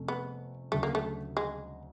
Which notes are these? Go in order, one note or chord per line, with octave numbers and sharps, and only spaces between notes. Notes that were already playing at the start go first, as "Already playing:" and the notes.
Already playing: F2 C3 A3 C#4
B3
D2 C#3 F#3 A3
A#3
A3
G#3